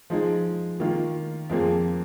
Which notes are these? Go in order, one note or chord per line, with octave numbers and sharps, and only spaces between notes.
F3 G#3 D#4 G#4
D#3 A#3 F4
F2 F3 A#3 G#4